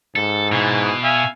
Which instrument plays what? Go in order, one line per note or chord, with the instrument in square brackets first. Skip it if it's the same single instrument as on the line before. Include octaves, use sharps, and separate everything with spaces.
[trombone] G#2 [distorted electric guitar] A4
[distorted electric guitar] B2 [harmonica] E3
[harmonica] E5 F5 G#5